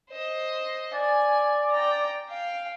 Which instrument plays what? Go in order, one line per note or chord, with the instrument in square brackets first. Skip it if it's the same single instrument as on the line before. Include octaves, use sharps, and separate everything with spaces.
[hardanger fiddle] C5 D#5
[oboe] D5 [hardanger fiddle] G#5
[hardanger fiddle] G5 A#5
F5 G5